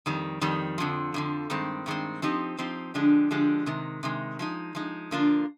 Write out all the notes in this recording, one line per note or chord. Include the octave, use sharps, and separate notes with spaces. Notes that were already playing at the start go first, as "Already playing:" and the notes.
F2 D#3 G3
F2 D#3 G3
F2 D3 F3
F2 D3 F3
G2 D#3 G#3 C4
G2 D#3 G#3 C4
F3 C4 D#4 G4
F3 C4 D#4 G4
D3 F3 G#3 D4 G4
D3 F3 G#3 D4 G4
C3 D#3 G#3
C3 D#3 G#3
F3 G#3 D#4
F3 G#3 D#4
D3 F3 A#3 D4 F4